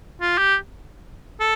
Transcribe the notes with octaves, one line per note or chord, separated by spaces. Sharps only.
F4
G4
A4